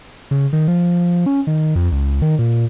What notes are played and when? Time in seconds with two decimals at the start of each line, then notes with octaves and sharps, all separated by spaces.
0.31 C#3
0.53 D#3
0.68 F3
1.26 C#4
1.47 D#3
1.75 F2
1.92 C#2
2.22 D#3
2.39 A#2